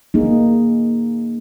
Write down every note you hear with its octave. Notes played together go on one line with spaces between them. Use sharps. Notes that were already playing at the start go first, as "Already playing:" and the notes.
A#3 D#4 G#4